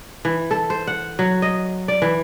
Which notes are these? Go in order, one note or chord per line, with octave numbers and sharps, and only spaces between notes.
E3
A4
C5
F#5
F#3
D#5
D5
E3